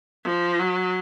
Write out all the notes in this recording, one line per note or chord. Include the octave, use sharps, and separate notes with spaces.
F3
F#3